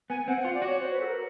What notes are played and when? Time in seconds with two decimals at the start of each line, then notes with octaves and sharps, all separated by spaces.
0.10 B3 G#5
0.28 C4 F#5
0.41 F4 F#5
0.54 D5
0.62 F#4 C#5
0.80 C5
0.92 B4
1.01 A4
1.06 A#4